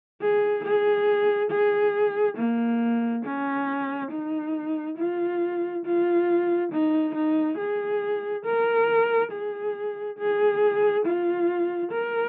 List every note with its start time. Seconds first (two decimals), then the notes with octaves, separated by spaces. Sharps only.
0.21 G#4
0.64 G#4
1.50 G#4
2.37 A#3
3.25 C#4
4.11 D#4
4.97 F4
5.85 F4
6.72 D#4
7.15 D#4
7.57 G#4
8.45 A#4
9.31 G#4
10.18 G#4
11.05 F4
11.91 A#4